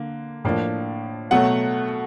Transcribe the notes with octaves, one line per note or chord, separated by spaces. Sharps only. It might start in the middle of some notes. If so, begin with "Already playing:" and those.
Already playing: D3 A#3
A2 F3 A#3 D4
B2 F#3 A3 F#5